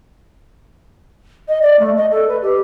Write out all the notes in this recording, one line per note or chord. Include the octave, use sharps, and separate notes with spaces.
D#5
D5
A3
D#5
A4
B4
G4